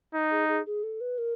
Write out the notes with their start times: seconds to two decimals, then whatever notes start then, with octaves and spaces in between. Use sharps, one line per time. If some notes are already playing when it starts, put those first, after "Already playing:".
0.15 D#4
0.31 G#4
0.48 G#4
0.66 G#4
0.83 A4
1.01 B4
1.18 A#4